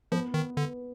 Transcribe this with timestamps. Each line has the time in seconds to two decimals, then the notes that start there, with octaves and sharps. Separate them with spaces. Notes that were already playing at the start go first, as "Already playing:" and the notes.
0.12 F3 B3 B4
0.34 D#3
0.57 D3